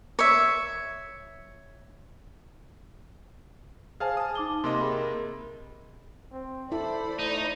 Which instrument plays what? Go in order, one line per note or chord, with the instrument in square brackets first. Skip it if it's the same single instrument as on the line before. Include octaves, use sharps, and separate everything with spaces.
[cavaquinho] C#5 E5
[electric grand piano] G#4 F5 A5 [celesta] C5 G#5 F6
[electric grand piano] A5 D#6
[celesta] D#4 D6 G7
[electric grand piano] C3 A#3 D#5 [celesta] C6
[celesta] G#4 A#4 B5
[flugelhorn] C4
[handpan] E4 [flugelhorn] A4 [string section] C5 D5 B5
[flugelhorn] A3 [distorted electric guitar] D#4